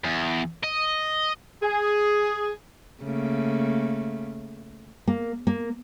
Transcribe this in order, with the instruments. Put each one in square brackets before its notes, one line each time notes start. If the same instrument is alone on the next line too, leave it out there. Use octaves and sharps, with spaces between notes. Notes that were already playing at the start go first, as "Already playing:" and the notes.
[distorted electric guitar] E2
D#5
[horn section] G#4
[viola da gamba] C#3 A3 A#3
[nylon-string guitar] A#3
A#3